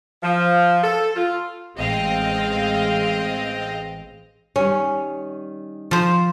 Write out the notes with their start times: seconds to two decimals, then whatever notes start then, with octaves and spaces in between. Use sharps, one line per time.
0.23 F3
0.82 A4
1.15 F4
1.76 A1 G#3 C4 D#5 F5 G5
4.56 D#3 G3 C#4 C#5
5.91 F3 C5